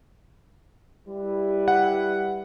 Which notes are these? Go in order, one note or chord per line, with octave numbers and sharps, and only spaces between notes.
G3 E4 B4
F#5